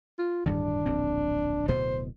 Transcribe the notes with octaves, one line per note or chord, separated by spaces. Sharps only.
F4
D1 G2 D#3 D4
D1 A#1 C4
D1 B2 B3 C5